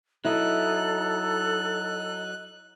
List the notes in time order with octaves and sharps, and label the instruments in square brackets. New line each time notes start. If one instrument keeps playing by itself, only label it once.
[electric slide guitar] F#3 D#4 [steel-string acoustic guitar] E4 [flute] A4 [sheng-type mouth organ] F#6